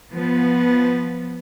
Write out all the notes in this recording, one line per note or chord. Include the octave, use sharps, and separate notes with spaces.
F3 B3